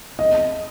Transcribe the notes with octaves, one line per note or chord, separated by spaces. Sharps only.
D#5